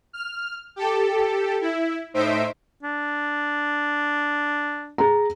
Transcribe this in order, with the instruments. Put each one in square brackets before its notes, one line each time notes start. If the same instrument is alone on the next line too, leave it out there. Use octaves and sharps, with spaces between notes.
[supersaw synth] F6
G4 A4
E4
A2 D#4 C5 E5 B6 D7
[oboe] D4
[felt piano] G#4 A#5